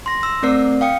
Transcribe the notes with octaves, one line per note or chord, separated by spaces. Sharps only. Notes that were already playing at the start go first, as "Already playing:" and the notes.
C6 A#6
E6
A3 C4 A#4 D5 C7
F5 G5 D#6 C#7